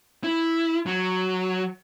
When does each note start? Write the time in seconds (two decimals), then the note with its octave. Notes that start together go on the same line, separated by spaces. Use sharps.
0.24 E4
0.86 F#3